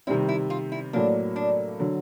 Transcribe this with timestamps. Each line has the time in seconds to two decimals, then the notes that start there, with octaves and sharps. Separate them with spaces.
0.07 C3 D#3 G3 C4 E4
0.29 E4
0.50 F4
0.72 E4
0.93 A2 F#3 A#3 D4
1.36 D4
1.80 D3 F#3